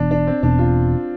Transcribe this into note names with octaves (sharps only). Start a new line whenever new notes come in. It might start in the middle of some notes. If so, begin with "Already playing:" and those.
Already playing: E1 E2 B2 D4
D4
C4
E1 E2 B2 D4
F4